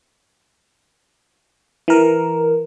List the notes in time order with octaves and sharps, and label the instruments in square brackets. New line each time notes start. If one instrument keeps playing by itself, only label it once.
[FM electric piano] E3 A#4